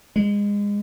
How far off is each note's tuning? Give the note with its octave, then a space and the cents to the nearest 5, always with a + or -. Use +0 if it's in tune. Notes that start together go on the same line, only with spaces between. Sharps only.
G#3 -25